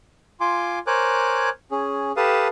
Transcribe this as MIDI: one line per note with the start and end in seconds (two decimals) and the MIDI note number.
0.41 0.79 65
0.41 0.79 80
0.41 0.79 84
0.41 0.79 86
0.87 1.49 70
0.87 1.49 72
0.87 1.49 73
0.87 1.49 80
0.87 1.49 86
0.87 1.49 90
1.71 2.12 61
1.71 2.12 68
2.17 2.48 67
2.17 2.48 69
2.17 2.48 71
2.17 2.48 77
2.17 2.48 81
2.17 2.48 87